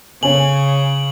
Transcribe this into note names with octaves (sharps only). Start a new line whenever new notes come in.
C#3 C#4 G#5 F#7